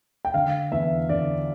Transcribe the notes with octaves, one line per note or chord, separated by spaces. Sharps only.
G5
D3 F5
E2 E5
D3 D5